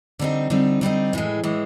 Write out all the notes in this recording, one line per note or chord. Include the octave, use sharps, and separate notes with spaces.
D3 G3 C4 D#4
D3 G3 C4 D#4
D3 G3 C4 D#4
A2 E3 G#3
A2 E3 G#3